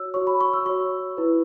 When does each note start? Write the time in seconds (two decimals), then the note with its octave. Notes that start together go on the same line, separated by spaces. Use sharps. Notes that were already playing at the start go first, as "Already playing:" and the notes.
Already playing: F#4 C#5 E6
0.14 F#4 C#5 C#6
0.27 B5
0.41 C#6
0.54 E6
0.65 F#4 C#5 C#6
1.17 E4 B4